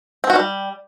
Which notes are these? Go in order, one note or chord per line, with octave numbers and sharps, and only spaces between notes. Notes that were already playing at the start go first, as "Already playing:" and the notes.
C4
F#4
G3